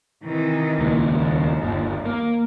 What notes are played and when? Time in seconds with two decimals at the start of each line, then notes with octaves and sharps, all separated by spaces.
0.23 C3 D#3 E3
0.78 D#1 C#2 A#3
1.08 D#2
1.61 G1
2.05 A#3